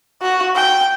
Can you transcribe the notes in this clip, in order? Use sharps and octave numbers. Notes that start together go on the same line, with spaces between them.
F#4
G5